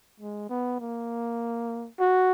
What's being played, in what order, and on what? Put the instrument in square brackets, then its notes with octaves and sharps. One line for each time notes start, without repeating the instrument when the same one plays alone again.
[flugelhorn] G#3
B3
A#3
F#4